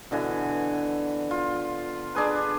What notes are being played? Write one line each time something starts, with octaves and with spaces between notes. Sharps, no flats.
B2 D3 E3 G#5
F4
D4 G#4 B4